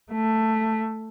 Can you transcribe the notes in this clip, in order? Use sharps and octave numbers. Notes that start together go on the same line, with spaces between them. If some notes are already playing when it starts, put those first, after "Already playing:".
A3